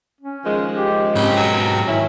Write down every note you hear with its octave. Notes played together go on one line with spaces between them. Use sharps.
C#4
D#3 F3 G#3
G4
G#2 C#3 C4 G4
B2 F#3
D#3 C#4 E4